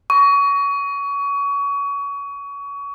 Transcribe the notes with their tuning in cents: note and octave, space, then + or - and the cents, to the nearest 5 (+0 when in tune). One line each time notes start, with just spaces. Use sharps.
C#6 +30